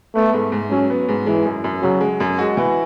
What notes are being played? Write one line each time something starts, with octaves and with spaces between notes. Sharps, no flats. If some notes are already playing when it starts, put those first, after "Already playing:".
A3 B3
G#2
G#2
F#3 C#4
B3
G#2
E3 G#3
F#2
F#2
C#3 F#3
G#3
F#2
G#3 F#4
E3